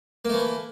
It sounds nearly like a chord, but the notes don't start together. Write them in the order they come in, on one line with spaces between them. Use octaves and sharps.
A#3 A3 E3